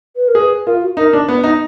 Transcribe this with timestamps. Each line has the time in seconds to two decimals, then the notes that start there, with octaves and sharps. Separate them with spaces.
0.16 B4
0.28 A#4
0.35 G#4
0.39 B4
0.66 F4 A#4
0.82 F#4
0.97 D#4 A#4
1.13 D4
1.29 B3
1.43 D#4